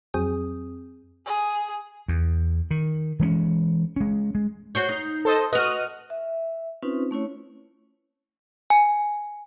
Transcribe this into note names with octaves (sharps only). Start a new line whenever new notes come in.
F2 F#3 C4 G#4 D#6
G#4
E2
D#3
E3 G#3 B3 C#4
G#3 C#4
G#3
F#4 C5 C#5 G6 C7
D#4
A4 C5 D#5
F#4 B4 D#5 F6 D#7
E5
C4 C#4 D#4 F4 B4 C5
A3 C#4 E4 C#5
G#5